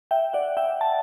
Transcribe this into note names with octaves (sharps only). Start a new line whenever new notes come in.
E5 G5
D5 F#5
E5 G5
A5